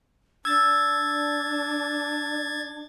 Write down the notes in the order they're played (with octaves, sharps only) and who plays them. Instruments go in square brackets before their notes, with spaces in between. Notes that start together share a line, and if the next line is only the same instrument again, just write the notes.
[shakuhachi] D4 [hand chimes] E6 [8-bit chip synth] G#6 A6